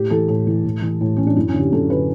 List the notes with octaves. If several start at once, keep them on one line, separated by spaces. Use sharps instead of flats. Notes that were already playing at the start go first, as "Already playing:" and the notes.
Already playing: A2 G4
E3 A4
A2 A4
E3
A2
E3
A2
E3 C#4
D4
F#2 E4
C#4
D3
G4
F#2 A4
D3 B4